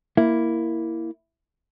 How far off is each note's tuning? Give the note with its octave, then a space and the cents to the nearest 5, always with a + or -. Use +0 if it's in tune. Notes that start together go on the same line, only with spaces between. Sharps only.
A#3 +0 E4 +0